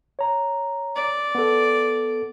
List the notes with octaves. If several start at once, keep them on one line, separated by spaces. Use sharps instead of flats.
C#5 A#5
D5
B3 A4